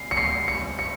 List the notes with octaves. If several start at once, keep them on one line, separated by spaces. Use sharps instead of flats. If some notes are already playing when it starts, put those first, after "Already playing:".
Already playing: C7
C#7
C7
C#7
C#7